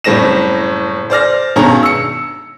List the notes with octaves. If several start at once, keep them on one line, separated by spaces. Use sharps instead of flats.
F#1 A2 G3 C4 A#6 E7
C5 D5 F6 A#6
G2 B2 D#3 G#3 C#4 A#5
E6 C#7